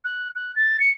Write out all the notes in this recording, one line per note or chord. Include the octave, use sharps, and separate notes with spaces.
F#6
F#6
A6
C#7